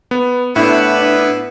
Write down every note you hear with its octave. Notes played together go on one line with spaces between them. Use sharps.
B3
A2 B3 D4 E4 B4